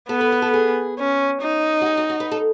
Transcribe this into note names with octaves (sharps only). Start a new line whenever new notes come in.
B3 A4
B4
B4
A4
G#4
C#4
D#4
F#4
G#4
F#4
F#4
B4
A4